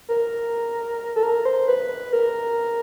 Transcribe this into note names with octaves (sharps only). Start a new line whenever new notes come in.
A#4
A4
A#4
C5
B4
A#4